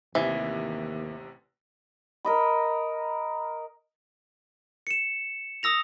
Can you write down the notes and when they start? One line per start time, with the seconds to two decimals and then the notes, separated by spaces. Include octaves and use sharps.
0.15 A1 D#2 C3 E3
2.25 A#4 D#5 B5
4.87 C#7 E7
5.63 D#6 E6 A#6 F7